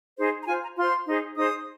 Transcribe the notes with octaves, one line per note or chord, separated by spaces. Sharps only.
D#4 G#4 C5
A#5
F4 C5 G#5
A#5
F4 C5 C6
D#4 G#4 C5
D#4 G#4 C5 D#6